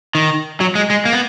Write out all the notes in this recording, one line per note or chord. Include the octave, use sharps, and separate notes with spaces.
D#3
F#3
G#3
G#3
A#3
B3